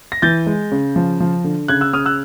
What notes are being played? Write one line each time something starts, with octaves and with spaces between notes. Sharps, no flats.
A#6
E3 G6 A6
G#3
C#3
F3
F3
D3
C#3 F#6 G#6
E6 F#6
C#3 D#6 F6
E6 F#6